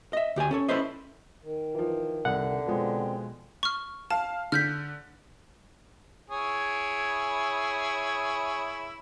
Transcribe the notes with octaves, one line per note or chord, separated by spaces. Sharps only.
D#5 E5
D2 G4 D5 G#5
C#4 A4 C#5
C#4 E4 A4 B4 C5 D#5
D#3
E3 F3
C2 D3 F#5
B2 F3 G#3 C4
C#6 F6
F5 A5
D3 F6 G6 B6
E4 G#4 C#5